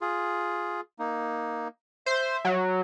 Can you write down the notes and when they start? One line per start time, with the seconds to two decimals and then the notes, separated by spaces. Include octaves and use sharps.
0.01 F4 G#4
0.99 A#3 D#4
2.06 C5 E5
2.45 F#3